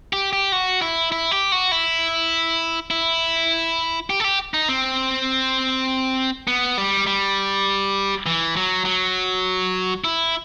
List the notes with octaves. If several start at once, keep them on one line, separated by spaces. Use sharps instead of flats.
G4
G4
F#4
E4
E4
G4
F#4
E4
E4
G4
A4
G4
D#4
C4
B3
G3
G3
E3
F#3
F#3
E4